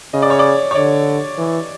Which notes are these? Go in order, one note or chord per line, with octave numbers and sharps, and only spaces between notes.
C#3 D#5
D5
C#5
D5
C#5
D3 D5
E3